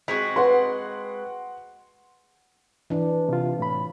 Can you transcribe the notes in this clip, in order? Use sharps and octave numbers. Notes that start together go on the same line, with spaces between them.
G#3 C4 F#4 B6
B4 F#5 C6
E3 D4
C3 F4
A2 B5